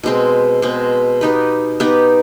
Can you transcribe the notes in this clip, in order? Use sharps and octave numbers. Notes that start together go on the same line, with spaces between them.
B2 G#3 C4
B2 G#3 C4
B3 D#4 G4 B4
B3 D#4 G4 B4